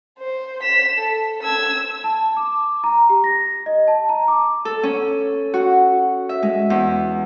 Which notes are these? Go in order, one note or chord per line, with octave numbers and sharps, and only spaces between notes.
C5
B6 E7
A4
E6 G#6
A5
D6
A#5
G4
A#6
D#5
A5
A#5
D6
A4
C#4
F#4
E5
G#3
E2